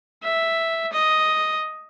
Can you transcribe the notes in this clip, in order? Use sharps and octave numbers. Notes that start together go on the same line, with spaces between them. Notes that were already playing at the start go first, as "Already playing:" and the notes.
E5
D#5